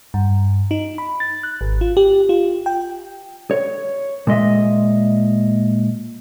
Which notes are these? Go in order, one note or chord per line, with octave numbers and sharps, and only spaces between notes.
G2
D#4
B5
A6
F#6
G#1
F4
G4
F4
G5
C#5
A#2 G#3 D#5 E5